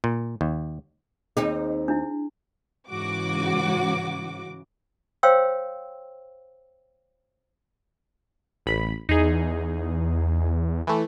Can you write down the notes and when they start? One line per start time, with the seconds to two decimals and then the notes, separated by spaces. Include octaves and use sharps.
0.04 A#2
0.41 D#2
1.37 D#2 C4 D#4 G#4
1.88 D4 E4
2.89 G#2 C#3 E3 F#4 D6
5.23 C5 C#5 F5 G5 C6 E6
8.66 A1 B5
9.09 E2 D#4 G#4
10.87 E3 A3